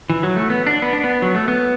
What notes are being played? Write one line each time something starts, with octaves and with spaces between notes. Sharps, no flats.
E3
F#3
A3
B3
D4
B3
D4
B3
F#3
A3
B3